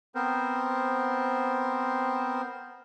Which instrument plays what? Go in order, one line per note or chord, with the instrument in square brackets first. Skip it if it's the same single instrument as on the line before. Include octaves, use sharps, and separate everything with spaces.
[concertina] B3 C4 A#4 C5